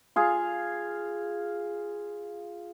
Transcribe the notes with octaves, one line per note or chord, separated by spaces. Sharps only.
F4 G#4 F5